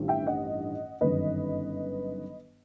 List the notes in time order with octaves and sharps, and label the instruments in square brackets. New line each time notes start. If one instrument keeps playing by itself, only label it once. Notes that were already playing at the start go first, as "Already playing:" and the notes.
Already playing: [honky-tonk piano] A1 G2 D#3
E5 G5
D#5 F#5
G1 F#2 D#3 B4 D#5